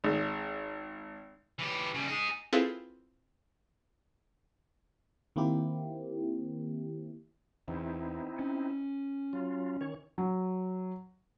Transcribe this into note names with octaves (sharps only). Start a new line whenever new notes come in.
G#1
E3 G4
C#3 G3
D#4 G#4
C4 E4 F4 G#4 A4 B4
D#3 A#3 C4 E4 G4
E2 C4 D#4 E4
C#4
F#3 F4
D#3 C#5
F#3